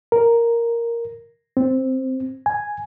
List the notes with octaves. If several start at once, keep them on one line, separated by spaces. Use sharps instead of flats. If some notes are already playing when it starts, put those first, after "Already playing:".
A#4
C4
G#5